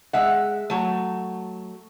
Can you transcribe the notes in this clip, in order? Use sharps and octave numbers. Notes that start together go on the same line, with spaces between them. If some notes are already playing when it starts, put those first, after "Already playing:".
G#3 E5 F#5
F#3 A3